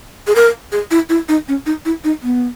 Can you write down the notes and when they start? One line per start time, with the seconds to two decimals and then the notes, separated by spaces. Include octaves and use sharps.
0.27 G#4
0.35 A#4
0.72 G#4
0.91 E4
1.10 E4
1.29 D#4
1.48 C#4
1.66 D#4
1.85 E4
2.04 D#4
2.23 B3